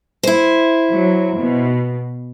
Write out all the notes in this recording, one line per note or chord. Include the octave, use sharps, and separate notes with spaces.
E4 C5
F#3
B2